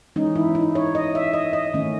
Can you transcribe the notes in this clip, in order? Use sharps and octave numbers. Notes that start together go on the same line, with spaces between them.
E3 G#3 C#4 D#4
E4
D#4
C#5
D#5
E5
D#5
D#5
D#3 A3 C#4